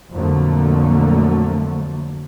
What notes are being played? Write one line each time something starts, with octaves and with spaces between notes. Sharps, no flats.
F2 A#2 D3 F#3 A3 A#3